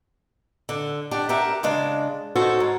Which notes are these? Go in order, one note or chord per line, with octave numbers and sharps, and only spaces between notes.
D3
D4 G4 F#5
G4 A#4 E5 F#5
C#3 G#3 D4
D#4 F#4 A4 C5 C#5
G#2